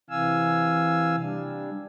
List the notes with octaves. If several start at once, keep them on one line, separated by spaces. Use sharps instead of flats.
C3 E3 F5 G#5 E6
G3 D4